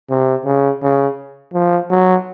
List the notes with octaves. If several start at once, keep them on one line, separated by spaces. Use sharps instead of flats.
C3
C#3
C#3
F3
F#3